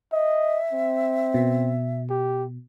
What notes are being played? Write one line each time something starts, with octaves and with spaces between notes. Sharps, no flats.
D#5 E5
C4
B2
G4